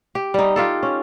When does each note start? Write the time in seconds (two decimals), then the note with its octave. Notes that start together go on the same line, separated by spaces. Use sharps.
0.15 G4
0.34 G3 D#4
0.56 F4 G4 A4
0.83 C#4